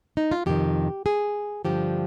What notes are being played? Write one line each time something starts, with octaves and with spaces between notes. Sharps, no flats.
D#4
F4
F2 C3 D#3 G4
G#4
G2 D3 F3 G4